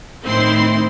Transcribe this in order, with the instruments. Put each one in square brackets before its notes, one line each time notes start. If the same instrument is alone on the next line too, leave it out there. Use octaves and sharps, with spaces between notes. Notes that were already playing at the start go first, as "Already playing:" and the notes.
[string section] A2 D#3 C4 E4 C6